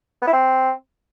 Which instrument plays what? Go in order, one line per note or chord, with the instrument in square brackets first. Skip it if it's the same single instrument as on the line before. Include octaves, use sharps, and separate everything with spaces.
[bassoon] B3
E4
C4